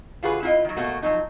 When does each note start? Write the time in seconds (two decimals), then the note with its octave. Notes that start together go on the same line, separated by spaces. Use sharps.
0.23 D3 F4 F#4 G#4 B4
0.43 E4 F4 D#5
0.64 D#3 F#3
0.76 B2 A3 A#3 F#4
1.03 F3 F#3 D#4